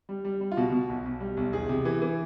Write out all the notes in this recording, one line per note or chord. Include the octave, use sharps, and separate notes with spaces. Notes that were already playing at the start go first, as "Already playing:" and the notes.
G3
G3
G3
F4
B2 F#4
B2
B1
B1
G3
B1
E2 G#4
C3
E3
E3